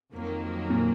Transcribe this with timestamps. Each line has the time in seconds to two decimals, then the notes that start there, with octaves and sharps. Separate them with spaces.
0.12 F2 D#3 F#3 A#3
0.70 A#2